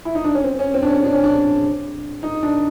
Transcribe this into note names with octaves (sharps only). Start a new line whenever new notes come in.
E4
D#4
D4
C#4
C4
C#4
C4
D4
C#4
D4
C#4
D4
D#4
D4